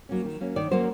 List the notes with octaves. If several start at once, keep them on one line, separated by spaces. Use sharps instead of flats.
F#3 A#3 C#4
D#3
F#3 A#3 C#4
D#3 D5
F#3 A#3 C#4 C5